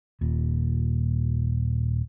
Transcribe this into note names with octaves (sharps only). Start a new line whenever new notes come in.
D#1 A#2